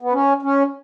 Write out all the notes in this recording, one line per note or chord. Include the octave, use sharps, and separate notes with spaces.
B3
C#4
C#4